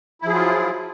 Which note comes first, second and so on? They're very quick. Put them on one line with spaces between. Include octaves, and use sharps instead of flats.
E4 F3 G#4 F#3 F4